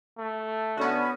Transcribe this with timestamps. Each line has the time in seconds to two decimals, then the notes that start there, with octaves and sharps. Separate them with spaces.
0.18 A3
0.77 D3 B3 C#4 F#4